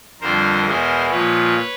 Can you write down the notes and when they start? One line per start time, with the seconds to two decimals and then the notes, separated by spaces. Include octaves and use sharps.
0.21 F2 D3 G3 A#4 C5
0.66 E2 B2 G#3 A#4 C5
1.11 A#2 F3 G#3 B4 C#5